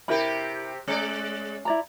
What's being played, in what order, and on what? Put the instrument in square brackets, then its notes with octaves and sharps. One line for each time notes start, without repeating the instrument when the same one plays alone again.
[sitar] C3 G4 [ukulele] E4 A#4 B5
[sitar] G#3 D5 [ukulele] C#4
[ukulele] E4 D5 A#5